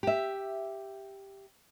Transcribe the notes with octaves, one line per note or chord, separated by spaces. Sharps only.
G4 E5